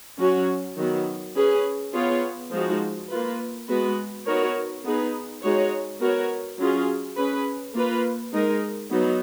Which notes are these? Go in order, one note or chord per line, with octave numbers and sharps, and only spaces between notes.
F#3 C#4 F#4 C#5
D#3 F#3 B3
C#4 G#4 B4
B3 F4 G#4 C#5
F3 G#3 D#4 F#4
A#3 F4 B4
G#3 B3 F#4 B4
B3 D#4 F#4 A#4 C#5
B3 D#4 G#4 B4
G#3 D#4 F#4 C#5
B3 F#4 A#4 C#5
F#3 C#4 F4 G#4
C#4 G#4 B4
A#3 F4 B4
G#3 D#4 A#4
F#3 B3 D#4